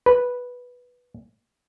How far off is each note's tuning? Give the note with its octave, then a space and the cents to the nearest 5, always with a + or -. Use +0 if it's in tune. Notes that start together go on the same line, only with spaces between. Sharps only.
B4 -5